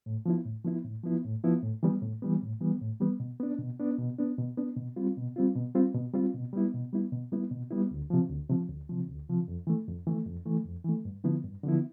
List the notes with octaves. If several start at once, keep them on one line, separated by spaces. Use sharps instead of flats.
A2
F3 B3 E4
A2
F3 B3 E4
A2
F3 B3 E4
A2
F3 B3 E4
A2
E3 G3 B3
A2
E3 G3 B3
A2
E3 G3 B3
A2
E3 G3 B3
B2
B3 D4
B2
B3 D4
B2
B3 D4
B2
B3 D4
B2
G3 C4 F4
B2
G3 C4 F4
B2
G3 C4 F4
B2
G3 C4 F4
B2
G3 B3 E4
B2
G3 B3 E4
B2
G3 B3 E4
B2
G3 B3 E4
D2
C3 F3
D2
C3 F3
D2
C3 F3
D2
C3 F3
F2
E3 A3
F2
E3 A3
F2
E3 A3
F2
E3 A3
G2
D3 F3 B3 E4
G2
D3 F3 B3 E4